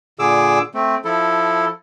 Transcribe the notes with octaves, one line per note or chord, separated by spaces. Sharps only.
A#2 D3 G#4 D6 E6
A3 C4
F3 E4 A4